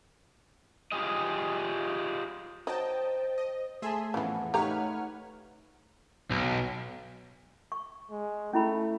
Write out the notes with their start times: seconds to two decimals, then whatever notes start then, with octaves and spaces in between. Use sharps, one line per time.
0.92 F4 G4 G#4 D#5
2.67 F#3 D#4 C5 D#5 G5 A5
3.38 D#5
3.82 A3 G#4 E5 G#5 A5 C6
4.14 F2 A2 C#3 E3 B3 F#5
4.54 A3 D#4 G4 B4 C#5 F5 A#5 F6
6.31 B1
7.72 C#6
8.11 G#3
8.53 A3 C#4 E4 B5